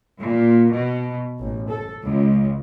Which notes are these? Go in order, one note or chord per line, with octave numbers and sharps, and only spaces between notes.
A#2
B2
A1
A4
C#2